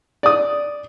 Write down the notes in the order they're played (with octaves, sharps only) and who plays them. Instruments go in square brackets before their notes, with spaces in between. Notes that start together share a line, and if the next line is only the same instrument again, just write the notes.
[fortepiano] D5 D#6